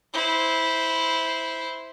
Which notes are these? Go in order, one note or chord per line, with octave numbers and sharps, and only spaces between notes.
E4 C5